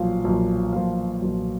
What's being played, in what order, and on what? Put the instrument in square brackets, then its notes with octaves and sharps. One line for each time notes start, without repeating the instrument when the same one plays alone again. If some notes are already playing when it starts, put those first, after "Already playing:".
Already playing: [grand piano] B1 A#2 F3 F5
B1 A#2 F3
B1 A#2 F3 F5
B1 A#2 F3